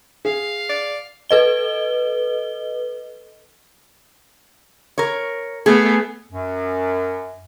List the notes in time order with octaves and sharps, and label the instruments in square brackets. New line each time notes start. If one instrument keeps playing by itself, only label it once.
[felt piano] G#4 [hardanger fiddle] F5
[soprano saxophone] D5
[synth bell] A4 B4 D#5 G7
[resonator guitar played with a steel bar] A#4 C#5
[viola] A3 B3 [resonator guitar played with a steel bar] G#4
[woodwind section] F#2